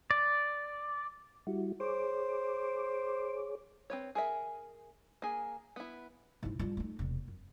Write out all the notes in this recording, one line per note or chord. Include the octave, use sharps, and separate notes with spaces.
D5
G3 E4 F#4
G#4 C5 C#5 D6
C4 B4 C#5
G#4 A#4 E5
A#3 G#4
B3 E4
G#2 E4
G2 F4
A3 D#4
E1 C3
F#2